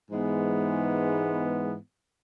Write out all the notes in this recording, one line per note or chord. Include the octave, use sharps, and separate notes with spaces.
G#2 E3 G#3 B3